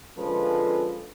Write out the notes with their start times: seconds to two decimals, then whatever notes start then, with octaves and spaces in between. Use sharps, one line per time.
0.17 D3 F3 G#3 C#4 A4 B4